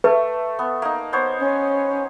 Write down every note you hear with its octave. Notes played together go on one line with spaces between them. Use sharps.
A3 B4
B3
A#3 D#4
B3 C5 C#5
C#4